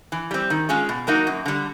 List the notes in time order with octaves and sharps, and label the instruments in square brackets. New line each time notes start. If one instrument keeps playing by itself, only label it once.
[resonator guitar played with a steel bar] E3
G3 C4
D#3
G#3 C#4 F4 G#4
B2
F#3 A#3 D#4 F#4
F#2
D3 G3